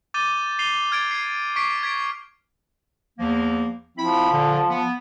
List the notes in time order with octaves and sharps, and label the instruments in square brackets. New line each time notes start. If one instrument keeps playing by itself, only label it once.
[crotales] D6 G6 A6 D#7 G7
C7 D#7 F7 G7
F6 G#6 A6 D7
G#6 C7
C#6 D6 B6 C7 D7
G#6 B6 D7
[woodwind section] E2 F3 A#3
[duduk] F3 [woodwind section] C4 E4 B5
[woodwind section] A#2 D3
B3